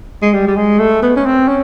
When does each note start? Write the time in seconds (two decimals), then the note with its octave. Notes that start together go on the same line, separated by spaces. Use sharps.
0.22 G#3
0.34 G3
0.47 G3
0.56 G#3
0.79 A3
1.02 B3
1.16 C#4
1.26 C4
1.48 C#4